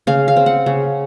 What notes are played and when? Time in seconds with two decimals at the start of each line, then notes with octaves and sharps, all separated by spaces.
0.07 C#3 F5
0.28 F5
0.36 C4
0.46 F#5
0.66 C#3